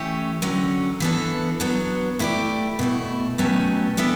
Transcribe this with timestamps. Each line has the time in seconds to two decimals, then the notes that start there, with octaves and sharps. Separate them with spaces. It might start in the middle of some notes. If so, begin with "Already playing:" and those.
Already playing: E3 A3 C#4 G4 C#5
0.42 D3 F#3 C#4
1.00 E3 B3 D4 A4
1.60 F#3 B3 D4
2.19 A3 E4 G4 D5
2.79 B2 A3 E4
3.38 B2 F#3 A3 C#4 G4
3.97 E3 B3 D4 A4 E5